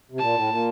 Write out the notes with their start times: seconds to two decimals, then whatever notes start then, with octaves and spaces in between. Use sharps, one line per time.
0.11 C3
0.19 A#2 A5
0.34 A2
0.49 A#2